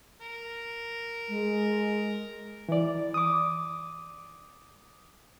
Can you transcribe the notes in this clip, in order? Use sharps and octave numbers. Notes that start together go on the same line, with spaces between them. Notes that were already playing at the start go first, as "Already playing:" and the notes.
A#4
G#3
E3 D5
D6 D#6